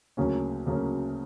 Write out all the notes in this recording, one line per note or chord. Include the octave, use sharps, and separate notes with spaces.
D2 C#3 F#3 A#3 C#4
D2 C#3 F#3 A#3 C#4